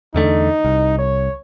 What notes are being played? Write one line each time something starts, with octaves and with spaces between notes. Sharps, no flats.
E2 D3 A3 D#4
C2
C#5